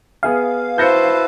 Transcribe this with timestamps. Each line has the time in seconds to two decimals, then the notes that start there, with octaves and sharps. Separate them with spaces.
0.23 B3 G#4 E5 F5
0.78 E4 F#4 B4 C5 A5 G6 A#6 C#7